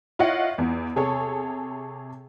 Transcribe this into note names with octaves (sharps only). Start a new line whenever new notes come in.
E4 F4 C#5 D#5 F#5
E2
C3 G#4 A4 C#5